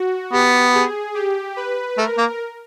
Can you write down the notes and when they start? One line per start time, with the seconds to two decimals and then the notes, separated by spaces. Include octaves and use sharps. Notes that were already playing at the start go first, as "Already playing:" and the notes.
Already playing: F#4
0.33 B3 G4
0.74 G#4
1.15 G4
1.57 B4
1.97 A3 A#4
2.18 A#3